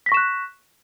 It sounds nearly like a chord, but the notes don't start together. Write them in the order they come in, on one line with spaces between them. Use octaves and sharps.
B6 A#6 C#6 E7 F#6